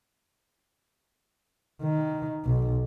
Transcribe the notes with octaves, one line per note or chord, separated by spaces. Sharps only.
D#3
B1